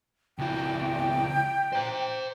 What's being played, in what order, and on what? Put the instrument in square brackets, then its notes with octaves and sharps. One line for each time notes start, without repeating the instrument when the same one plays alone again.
[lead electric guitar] C#2 E4 [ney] G5
[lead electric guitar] C5 A#5